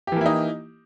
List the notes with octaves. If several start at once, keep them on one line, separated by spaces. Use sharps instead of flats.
E3 A#3 D#4 E4 G4